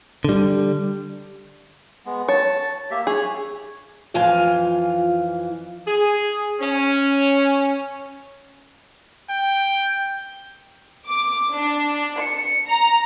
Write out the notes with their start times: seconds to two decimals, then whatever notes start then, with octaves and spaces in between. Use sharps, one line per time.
0.25 D3 G3
2.06 G#3 B3
2.28 C#5 A5
2.91 A#3 G4 E5
3.07 G#4 C#5
4.14 F2 E3 F4 F5 G#5
5.86 G#4
6.59 C#4
9.30 G5
11.10 D6
11.53 D4
12.20 C#7
12.68 A#5